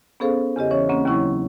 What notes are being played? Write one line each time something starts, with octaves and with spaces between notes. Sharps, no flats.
B3 C#4 G#4 A4 C5 F5
E2 C#3 G4 D#5
E3 C#4 C#5
D2 A#3 C4 C#4
D#2 C#3 F#3 E4 C#6